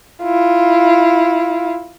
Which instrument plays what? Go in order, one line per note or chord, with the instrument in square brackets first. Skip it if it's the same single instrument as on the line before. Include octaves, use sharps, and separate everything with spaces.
[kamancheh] E4 F4